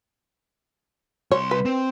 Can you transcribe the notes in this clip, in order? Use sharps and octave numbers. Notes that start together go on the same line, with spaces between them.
C2 C#5 C6
B4
C4